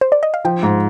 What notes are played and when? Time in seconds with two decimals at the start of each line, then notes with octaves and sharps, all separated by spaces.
0.01 C5
0.12 D5
0.23 D#5
0.34 F5
0.45 F3 G5
0.63 G#2